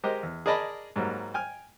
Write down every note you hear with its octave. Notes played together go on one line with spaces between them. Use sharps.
G#3 G4 A#4 C5 D#5
E2
G#4 A#4 D5 D#5 A5 B5
G#2 F#3 G3 A#3
G5 G#5 F6